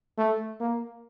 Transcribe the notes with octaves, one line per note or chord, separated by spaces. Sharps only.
A3
A#3